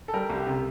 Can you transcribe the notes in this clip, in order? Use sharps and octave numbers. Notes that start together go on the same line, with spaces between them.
A4
G3 A#4
C2
G4
C3